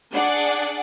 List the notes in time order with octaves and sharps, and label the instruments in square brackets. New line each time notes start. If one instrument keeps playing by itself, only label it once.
[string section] D4 G#4 D5 F#5